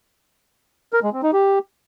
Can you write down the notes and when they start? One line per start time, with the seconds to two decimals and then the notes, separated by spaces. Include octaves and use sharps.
0.93 A#4
1.03 G#3
1.13 C4
1.23 D#4
1.33 G4